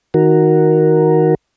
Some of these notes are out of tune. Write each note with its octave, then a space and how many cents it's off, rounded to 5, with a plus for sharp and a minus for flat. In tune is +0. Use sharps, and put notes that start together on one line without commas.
D#3 +20 F#4 +0 A#4 +0